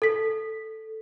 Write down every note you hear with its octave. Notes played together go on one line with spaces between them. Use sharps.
A4 B6